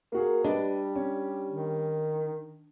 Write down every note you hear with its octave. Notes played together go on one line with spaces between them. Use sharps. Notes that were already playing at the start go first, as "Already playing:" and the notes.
A#3 F#4 G#4 A#4
G3 D4 B4 D#5
C#4
D#3